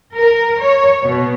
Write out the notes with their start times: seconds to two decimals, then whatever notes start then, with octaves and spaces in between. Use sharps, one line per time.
0.15 A#4
0.61 C#5
1.03 B2